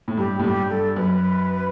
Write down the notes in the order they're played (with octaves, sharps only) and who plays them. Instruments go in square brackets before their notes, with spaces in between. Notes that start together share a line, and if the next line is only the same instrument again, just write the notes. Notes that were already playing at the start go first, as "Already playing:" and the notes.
[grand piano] A2
[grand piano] G2 [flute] G4
[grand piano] A2
[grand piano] G2 [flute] G4
[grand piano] G2 [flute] A4
[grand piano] F#2 [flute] B4